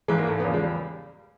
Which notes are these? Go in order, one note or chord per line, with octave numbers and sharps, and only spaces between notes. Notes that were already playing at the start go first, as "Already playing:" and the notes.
G#1 G#2 E3 G#3
A#3
A3
B3
E2 C#3 F3 A#3
G#3
G3